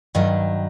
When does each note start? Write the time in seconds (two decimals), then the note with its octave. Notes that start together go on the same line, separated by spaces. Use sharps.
0.15 G2 D#3 F#3 A4